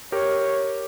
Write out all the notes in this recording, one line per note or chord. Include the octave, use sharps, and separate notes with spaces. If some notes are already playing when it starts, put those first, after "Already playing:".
G4 A#4 C#5